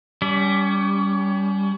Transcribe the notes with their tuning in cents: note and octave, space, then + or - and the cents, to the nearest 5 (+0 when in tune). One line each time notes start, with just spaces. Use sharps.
G3 +0 C#4 +30